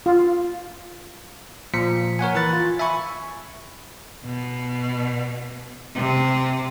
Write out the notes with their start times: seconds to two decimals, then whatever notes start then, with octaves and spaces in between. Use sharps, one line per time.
0.06 F4
1.74 A#2 F3 B6 C#7
2.19 A#4 C#5 F#5 G#5
2.35 E3 B4 B5 F#6 A6
2.53 F4
2.79 E5 G#5 B5 C#6
4.25 B2
5.95 C3